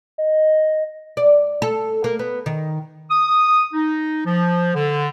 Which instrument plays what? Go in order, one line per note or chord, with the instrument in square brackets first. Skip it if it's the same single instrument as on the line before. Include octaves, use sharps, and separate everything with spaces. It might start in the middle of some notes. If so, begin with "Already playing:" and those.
[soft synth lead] D#5
[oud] D5
A4
A#3
B3
D#3
[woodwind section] D#6
D#4
F3
D3